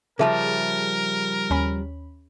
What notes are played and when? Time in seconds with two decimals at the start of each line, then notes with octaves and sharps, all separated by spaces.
0.19 C#3 F3 G3 G#4 A#4 E5 A5
1.50 D#2 C#4 B5